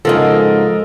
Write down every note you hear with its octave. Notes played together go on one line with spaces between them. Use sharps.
G#2 C#3 F3 A4 A#4 D#5